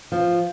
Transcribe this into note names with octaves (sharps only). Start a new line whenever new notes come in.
F3